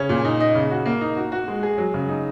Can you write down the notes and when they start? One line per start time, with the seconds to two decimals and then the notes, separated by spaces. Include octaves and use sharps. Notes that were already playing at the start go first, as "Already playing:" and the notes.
Already playing: C#3 C#4
0.09 A#2
0.25 D#4
0.40 D#5
0.55 C#3
0.71 F#4
0.86 A#3
1.01 D#4
1.17 F#4
1.32 F#4
1.48 G#3
1.63 G#4
1.78 F#3
1.94 C#3
2.09 D#4